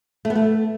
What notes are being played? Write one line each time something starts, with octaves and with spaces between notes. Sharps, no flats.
A3
B3
A3